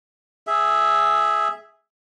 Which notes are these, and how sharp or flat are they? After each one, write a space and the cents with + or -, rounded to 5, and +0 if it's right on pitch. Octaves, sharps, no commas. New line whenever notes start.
G#4 +0 E5 +0